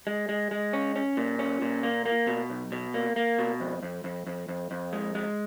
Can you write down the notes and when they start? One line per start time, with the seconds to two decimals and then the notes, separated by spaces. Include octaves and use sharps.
0.07 G#3
0.29 G#3
0.51 G#3
0.73 C#4
0.96 C#4
1.17 A#2
1.39 C#4
1.62 A#2
1.83 A#3
2.06 A#3
2.27 B2
2.50 B1
2.72 B2
2.94 A#3
3.16 A#3
3.39 B2
3.60 F2
3.83 F2
4.04 F2
4.27 F2
4.48 F2
4.71 F2
4.93 G#3
5.15 G#3